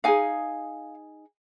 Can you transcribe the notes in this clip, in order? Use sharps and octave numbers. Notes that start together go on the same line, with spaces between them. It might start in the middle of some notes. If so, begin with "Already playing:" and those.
D#4 G#4 F5 G#5